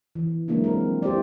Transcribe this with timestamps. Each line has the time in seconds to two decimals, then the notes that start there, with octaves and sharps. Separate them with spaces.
0.15 E3
0.48 F3 F#3 G#3 A#3 D4 E4
0.64 C4 A#4
1.02 E4 G4 C5 D5